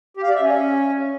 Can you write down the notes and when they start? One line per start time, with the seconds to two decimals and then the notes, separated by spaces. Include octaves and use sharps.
0.17 G4
0.23 F5
0.29 D5
0.35 E5
0.42 C#4